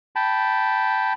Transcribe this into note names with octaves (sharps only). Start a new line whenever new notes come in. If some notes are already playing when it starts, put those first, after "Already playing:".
G5 A5 B5